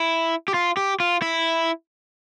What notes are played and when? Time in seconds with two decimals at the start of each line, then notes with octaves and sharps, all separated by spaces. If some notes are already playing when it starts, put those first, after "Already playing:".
Already playing: E4
0.48 G4
0.54 F4
0.77 G4
1.00 F4
1.22 E4